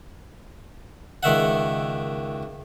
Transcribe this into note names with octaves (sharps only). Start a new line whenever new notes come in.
C#2 D#3 E5 F#5